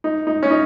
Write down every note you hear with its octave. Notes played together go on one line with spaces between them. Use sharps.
D#4
D#4
C#4
D#4